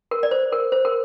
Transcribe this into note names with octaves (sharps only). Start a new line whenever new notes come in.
A#4
D5
C5
A#4
C5
A#4